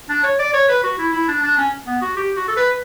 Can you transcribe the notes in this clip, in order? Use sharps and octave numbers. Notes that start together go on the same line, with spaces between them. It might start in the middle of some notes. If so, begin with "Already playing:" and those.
D4
C#5
D5
C#5
B4
F#4
E4
E4
D4
D4
C#4
B3
F#4
G4
F#4
A4
B4